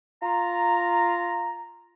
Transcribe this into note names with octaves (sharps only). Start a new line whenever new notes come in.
F4 A#5